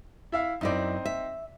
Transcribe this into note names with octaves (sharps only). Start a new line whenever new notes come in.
E4 E5 F5
F#2 C4 D#4 E4 D5
E5